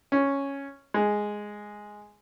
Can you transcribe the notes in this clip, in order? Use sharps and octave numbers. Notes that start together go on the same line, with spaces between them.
C#4
G#3